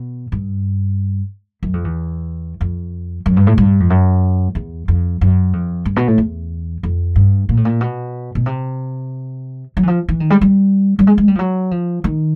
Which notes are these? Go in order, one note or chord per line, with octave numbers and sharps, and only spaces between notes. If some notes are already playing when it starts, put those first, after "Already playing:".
Already playing: B2
G2
F#2
F2
E2
F2
F#2
G2
A2
G2
F2
F#2
E2
F2
F#2
F2
G2
B2
A2
E2
F2
G2
A#2
A2
A#2
B2
B2
C3
F#3
E3
F3
E3
D#3
G3
G3
G3
G#3
G#3
G3
F3
F#3
F3
D#3